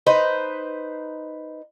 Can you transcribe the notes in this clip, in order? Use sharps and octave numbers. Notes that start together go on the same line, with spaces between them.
D#4 B4 C5